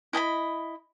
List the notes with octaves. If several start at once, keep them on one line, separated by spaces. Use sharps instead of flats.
E4 D#5 G#5 B5